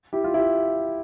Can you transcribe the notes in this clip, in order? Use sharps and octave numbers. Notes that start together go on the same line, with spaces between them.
E4 G4
F4
E4 G4